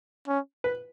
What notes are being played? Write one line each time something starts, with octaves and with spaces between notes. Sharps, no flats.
C#4
B4